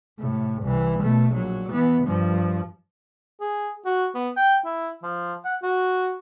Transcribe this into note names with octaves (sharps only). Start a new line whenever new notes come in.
A2 C3
C2 E3
B2 A3
A#1 F#3
E3 B3
G2 F3
G#4
F#4
B3
G5
E4
F3
F#5
F#4